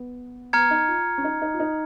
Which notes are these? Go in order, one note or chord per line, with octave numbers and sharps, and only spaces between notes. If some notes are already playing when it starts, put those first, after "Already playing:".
Already playing: B3
B3 A#5 F6 G#6 C#7
D#4
F4
C#4
D#4
D#4
F4
D#4